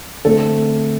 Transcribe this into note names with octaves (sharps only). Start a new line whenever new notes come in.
D3 A3 C4 A4